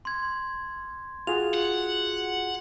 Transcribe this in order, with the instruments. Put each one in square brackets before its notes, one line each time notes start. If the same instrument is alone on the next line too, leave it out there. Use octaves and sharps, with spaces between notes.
[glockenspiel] C6 G#6
[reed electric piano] F4 F#4 G#4 [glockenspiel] F7
[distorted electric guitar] F#5